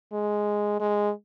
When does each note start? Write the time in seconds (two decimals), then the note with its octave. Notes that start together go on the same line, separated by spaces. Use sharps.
0.12 G#3
0.80 G#3